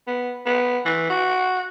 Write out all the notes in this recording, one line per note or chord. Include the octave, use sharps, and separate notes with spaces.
B3
B3
E3
F#4